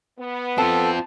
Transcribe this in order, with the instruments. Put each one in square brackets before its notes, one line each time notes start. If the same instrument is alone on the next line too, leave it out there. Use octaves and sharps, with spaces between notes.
[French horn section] B3
[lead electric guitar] C4 F4 [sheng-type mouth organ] A4 [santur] A5